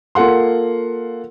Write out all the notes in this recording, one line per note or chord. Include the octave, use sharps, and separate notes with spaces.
A#3 F4 A4 F#5 C6